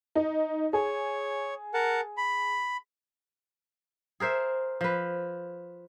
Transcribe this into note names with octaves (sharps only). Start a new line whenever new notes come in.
D#4
G#4 C#5
A#4 F#5 A5
B5
G#4 A#4 C5 E5
F3 B4